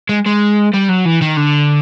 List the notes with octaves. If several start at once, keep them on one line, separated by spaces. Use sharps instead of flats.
G#3
G#3
G3
F#3
E3
D#3
D3